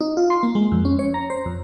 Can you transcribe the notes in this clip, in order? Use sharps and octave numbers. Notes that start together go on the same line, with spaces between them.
D#4
F4
C6
A#3
G#3
F2
C#4
C#5
A#5
C5
F2